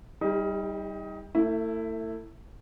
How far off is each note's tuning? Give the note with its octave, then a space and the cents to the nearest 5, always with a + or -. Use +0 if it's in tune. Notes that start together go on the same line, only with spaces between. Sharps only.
G3 +0 D#4 +25 G4 +40
A3 +35 E4 +0